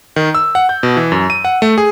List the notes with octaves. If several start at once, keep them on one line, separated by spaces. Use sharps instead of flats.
D#3
E6
F#5
G6
B2
E3
F#2
D#7
F#5
A3
G#4